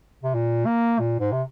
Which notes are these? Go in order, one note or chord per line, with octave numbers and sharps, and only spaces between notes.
C3
A#2
A#3
A#2
G#2
C3